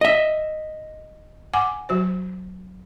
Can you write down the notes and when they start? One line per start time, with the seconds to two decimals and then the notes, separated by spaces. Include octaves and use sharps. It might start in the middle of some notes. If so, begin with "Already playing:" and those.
0.01 D#5 E5
1.54 F#5 G#5 D6
1.89 F#3 F#4 C5